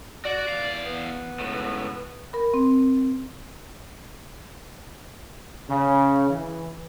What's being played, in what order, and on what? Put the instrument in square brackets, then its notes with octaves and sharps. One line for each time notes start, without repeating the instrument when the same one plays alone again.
[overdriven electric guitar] F#4 F#5 [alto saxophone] D5
[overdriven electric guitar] E2 F5
[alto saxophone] B3
[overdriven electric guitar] C#2 A2
[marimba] A#4 B5
C4
[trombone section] C#3
E3